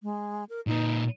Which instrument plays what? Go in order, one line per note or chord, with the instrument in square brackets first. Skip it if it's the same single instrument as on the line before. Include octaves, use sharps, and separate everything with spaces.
[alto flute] G#3
A#4
[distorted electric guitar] A#2 B4 [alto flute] D#4